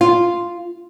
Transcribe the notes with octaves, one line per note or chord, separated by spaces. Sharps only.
F4